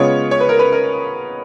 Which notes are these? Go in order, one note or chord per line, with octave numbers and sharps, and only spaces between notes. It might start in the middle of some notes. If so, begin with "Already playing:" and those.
Already playing: C#3 G#3 B3 F4 C#5
C#5
B4
A#4
B4
A#4